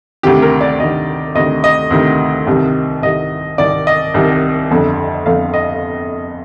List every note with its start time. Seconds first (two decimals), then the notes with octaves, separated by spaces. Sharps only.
0.23 D2 C3 D#3 G4
0.42 A#4
0.61 D5
0.80 D2 C3 D#3 D#5
1.35 D2 C3 D#3 D#5
1.64 D#5
1.91 D2 C3 D#3
2.47 C2 C3 D#3
3.02 C2 C3 D#3 D#5
3.58 C2 C3 D#3 D5
3.87 D#5
4.14 C2 C3 D#3
4.71 G1 F2 D3
5.26 G1 F2 D3 F5
5.54 D#5